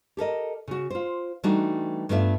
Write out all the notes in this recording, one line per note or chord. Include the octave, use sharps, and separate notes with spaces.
G4 A4 A#4 D#5
C#3 F#4
F4 C5
E3 G3 A3 D4 D#4 F#4
G2 A3 B3 D4 F4 E5